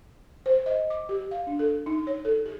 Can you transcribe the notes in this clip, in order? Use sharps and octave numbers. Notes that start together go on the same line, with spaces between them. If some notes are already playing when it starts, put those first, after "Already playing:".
C5
D#5
D6
G4
F5
D4
A4
D#4
C#5
A4
G#4